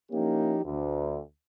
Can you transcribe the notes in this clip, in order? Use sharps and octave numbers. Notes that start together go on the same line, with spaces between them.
F3 A#3 C#4 D#4 E4 G4
D2